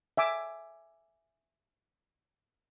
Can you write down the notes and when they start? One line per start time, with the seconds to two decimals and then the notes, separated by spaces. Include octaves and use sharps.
0.17 E5 G#5 D6